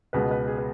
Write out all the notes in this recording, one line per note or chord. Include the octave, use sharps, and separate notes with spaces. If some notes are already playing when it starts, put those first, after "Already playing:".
C#2 B2 G#3 B3 B4
B4
G#4
B4